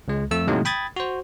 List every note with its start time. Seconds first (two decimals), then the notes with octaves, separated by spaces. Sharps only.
0.08 C#2 G#3
0.31 F2 A3 E6
0.48 A2 C3 D#3 F#3 G#3 A#3
0.65 G5 B5 D#6 G#6 A6
0.96 F#4 C5